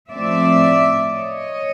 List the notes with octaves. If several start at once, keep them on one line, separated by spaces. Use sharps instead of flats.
A2 F3 A3 C4 D5 E5
C#5 D#5